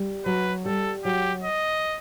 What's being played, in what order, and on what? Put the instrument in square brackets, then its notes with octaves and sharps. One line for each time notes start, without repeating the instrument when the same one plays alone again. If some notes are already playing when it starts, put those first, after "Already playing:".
Already playing: [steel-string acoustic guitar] G3
[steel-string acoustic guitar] F#3 [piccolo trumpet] B4
[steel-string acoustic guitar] G3 [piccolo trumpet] A4
[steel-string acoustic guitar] F#3 [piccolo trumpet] G4
[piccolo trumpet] D#5